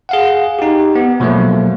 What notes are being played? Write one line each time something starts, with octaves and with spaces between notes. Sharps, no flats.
G#4 F5 F#5
D#4 G4
B3
B2 F3 F#3 A3 A#3